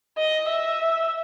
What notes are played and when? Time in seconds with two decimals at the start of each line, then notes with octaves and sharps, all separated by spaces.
0.18 D#5
0.48 E5